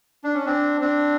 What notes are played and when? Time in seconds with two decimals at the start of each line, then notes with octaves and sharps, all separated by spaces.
0.24 D4
0.35 C#4
0.45 C4 D4
0.81 C4 D4